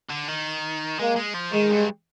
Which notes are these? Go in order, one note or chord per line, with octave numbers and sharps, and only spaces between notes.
D3
D#3
G#3 A#3
G#3
F3
D#3 G#3
G2